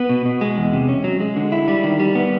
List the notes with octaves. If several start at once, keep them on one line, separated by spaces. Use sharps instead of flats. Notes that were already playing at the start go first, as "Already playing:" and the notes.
Already playing: B3
B2
B2
G#3
E2
C3
C#4
F#3
G#3
D3
E4
G3
D#3
G3
B3